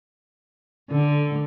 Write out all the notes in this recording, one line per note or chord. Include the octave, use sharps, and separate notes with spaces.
D3